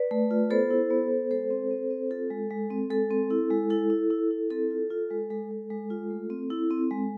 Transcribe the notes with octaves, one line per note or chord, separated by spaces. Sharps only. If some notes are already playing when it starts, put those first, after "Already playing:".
Already playing: B4 D5
A3
F4
B3 A4 C5
E4
B3
B3
G#3 A4 C5
C4
C4
C4
F4 A4
G#3
G#3
C4
G#3 A4
C4
E4
G#3
E4 A4
E4
E4
E4
C4 A4
F4
F4
G#3
G#3 A4
G#3
G#3
F4
A3
C4
E4
C4
G#3